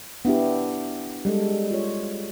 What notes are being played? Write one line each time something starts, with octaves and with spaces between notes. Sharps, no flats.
B3 D4 E4 G4
G3 G#3 A4
F4 C#5